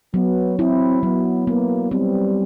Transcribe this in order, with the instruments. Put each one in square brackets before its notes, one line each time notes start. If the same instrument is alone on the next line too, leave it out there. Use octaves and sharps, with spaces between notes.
[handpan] F#3 [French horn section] B3
[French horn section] C4 [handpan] E4
[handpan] F#3 [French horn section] B3
[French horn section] A#3 [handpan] B3
[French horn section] G3 [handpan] C4